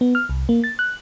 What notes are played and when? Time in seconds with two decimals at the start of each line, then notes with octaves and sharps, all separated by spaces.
0.01 B3
0.15 F6
0.29 C2
0.49 A#3
0.64 A6
0.79 F#6